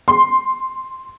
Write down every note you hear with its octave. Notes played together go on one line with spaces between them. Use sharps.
C6